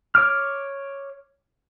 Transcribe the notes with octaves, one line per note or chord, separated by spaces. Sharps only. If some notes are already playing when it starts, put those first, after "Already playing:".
C#5 D6 F6